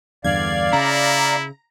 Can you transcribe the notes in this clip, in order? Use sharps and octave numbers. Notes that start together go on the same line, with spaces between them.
E2 G2 D3 D5 F5 G#6
C#3 E4 A#5